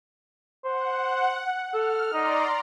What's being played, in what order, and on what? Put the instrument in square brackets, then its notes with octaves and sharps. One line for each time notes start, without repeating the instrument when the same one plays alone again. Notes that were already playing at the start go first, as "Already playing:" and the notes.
[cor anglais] C5 [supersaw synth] F#5
[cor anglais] A4 [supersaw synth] F6
[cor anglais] D#4 [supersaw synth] D5 A#5 C6